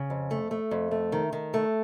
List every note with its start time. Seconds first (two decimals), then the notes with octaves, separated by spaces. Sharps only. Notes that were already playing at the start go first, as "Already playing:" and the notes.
Already playing: C#3
0.10 F2
0.31 A3
0.51 A3
0.71 F2
0.91 A3
1.12 D#3
1.33 D#3
1.54 A3